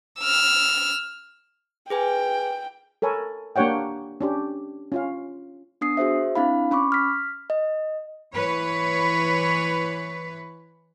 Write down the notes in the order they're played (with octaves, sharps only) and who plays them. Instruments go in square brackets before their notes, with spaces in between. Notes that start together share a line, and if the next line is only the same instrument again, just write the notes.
[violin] E6 F6
[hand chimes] G#4 B4 G#5 [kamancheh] G5
[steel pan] A4 A#4 C#5 G#5 B5
A#3 D4 G4 C#5 F#5 G5
C#4 D4 G4
C#4 F4 F5
[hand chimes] B3 D4 D#6 C7
F#4 G#4 C5 E5
C4 D4 E4 F5 B5
C#4 B5 C#6 D6
F6 B6
D#5
[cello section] E3 B4 C#5